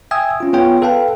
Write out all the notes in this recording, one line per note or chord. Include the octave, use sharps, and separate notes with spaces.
E5 G5 G#5 D#6 E6 G#6
C#4 F4
B3 F4 G#4 C#5 G5
A4 B4 F5 G5 A5